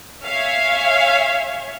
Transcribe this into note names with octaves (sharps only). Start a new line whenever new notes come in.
C#5 E5 F5 G#5